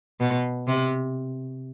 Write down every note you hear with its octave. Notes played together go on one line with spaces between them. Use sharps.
B2
C3